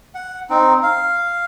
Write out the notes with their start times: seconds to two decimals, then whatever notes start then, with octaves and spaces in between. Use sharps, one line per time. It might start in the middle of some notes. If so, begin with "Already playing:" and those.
0.15 F#5
0.50 C4 D#4
0.83 F5